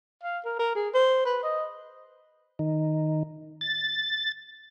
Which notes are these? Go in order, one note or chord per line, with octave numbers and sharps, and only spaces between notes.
F5
A#4
A#4
G#4
C5
B4
D#5
D#3
A6